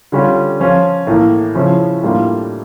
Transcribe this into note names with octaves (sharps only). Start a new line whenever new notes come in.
D3 G3 C#4 F4
F3 C#4 F4
A2 E3 A#3
C#3 F3 C#4 E4
A2 G3 A#3 D4 F4